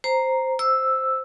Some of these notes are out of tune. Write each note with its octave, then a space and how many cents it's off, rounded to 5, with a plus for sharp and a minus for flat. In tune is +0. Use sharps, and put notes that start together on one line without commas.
C5 +0 A#5 +0
C5 +0 E6 +0